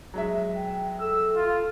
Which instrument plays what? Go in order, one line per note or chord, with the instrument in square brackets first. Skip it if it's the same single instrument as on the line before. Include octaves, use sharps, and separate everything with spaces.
[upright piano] F#3 G#3 E5
[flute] G5
[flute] A4 [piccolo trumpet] E6
[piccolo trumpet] F4